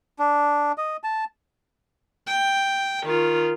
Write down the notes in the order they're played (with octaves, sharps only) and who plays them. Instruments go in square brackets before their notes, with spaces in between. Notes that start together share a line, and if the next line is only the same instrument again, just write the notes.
[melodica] D4
D#5
A5
[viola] G5
D#3 F4